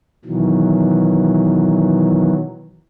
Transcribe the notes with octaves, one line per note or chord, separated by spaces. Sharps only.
B2 D#3 E3 F#3